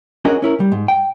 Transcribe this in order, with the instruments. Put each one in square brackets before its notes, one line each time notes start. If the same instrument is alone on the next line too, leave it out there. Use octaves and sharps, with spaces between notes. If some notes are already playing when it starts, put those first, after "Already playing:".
[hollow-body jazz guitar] C#4 D4 F#4 G#4 A#4 D#5
C#4 E4 A#4
G3
G#2
G5